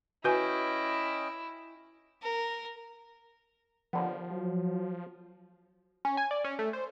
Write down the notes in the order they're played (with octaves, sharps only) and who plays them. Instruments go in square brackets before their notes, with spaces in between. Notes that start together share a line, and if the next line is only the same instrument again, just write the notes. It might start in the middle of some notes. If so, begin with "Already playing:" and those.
[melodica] C#4 D#5 G5 [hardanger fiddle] E4 [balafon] F#4 B4 G#5
[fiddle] A#4
[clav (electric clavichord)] D#2 D3 B3 [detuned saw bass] F3
[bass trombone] F#3
[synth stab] C#4
G#5
D5
C#4
A3
C5